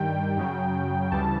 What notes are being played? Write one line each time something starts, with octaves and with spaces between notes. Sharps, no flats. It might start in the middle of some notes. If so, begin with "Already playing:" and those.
Already playing: G2 D#3 G3 G5
F#2 C#3 F#3
D2 C#3 E3 G3 A5